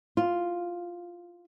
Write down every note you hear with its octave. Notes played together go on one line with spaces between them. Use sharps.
F4